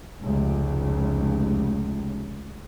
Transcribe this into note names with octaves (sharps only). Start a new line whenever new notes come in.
F1 C#2